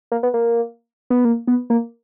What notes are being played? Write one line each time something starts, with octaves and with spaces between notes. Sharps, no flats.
A#3
B3
A#3
B3
A#3
B3
A#3